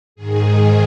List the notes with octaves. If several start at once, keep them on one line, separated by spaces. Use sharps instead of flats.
G#2 D#3 G#4